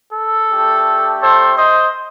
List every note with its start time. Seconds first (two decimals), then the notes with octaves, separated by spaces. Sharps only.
0.13 A4
0.49 A3 D4 G4
1.21 A4 C5
1.57 C5 D#5